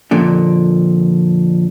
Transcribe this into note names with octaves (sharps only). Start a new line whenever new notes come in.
F2 A#2 D3